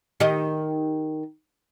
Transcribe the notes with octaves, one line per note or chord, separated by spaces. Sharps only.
D#3 G4 D#5